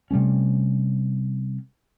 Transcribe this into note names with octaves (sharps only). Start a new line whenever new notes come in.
C3 G3 A3 C#4